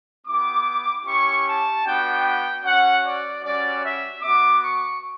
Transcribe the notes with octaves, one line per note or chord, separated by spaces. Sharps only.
B3 E4 G4 D6
C#4 E4 G4 C#6
A5
B3 D4 F#4 G5
C#4 F#4 F#5
D5
G3 C#4 F#4 D5
E5
B3 F#4 D6
C#6